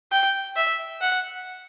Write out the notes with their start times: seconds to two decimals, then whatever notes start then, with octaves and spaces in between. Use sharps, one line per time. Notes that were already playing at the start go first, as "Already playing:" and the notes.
0.11 G5
0.56 E5
1.01 F#5